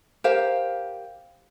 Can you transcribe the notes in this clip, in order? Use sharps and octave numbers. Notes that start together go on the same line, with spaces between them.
G4 A#4 C5 F5